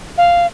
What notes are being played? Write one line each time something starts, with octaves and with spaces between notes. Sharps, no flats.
F5